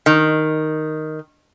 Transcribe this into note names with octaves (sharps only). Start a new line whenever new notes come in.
D#3